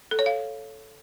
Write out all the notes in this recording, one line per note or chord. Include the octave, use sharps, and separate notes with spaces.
A4
C#5
F5